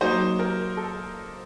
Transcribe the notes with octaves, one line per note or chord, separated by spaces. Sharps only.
F#3 A#3 D#4 C5
A#4
A4